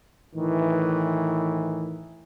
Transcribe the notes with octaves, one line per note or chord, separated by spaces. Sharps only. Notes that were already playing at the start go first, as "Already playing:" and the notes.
A2 D#3 E3